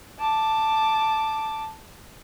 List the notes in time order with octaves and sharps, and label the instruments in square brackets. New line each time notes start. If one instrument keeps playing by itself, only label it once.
[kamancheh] A5 D6